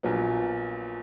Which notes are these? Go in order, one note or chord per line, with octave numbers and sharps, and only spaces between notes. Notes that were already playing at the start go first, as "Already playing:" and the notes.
A#1 A#2 F#3 B3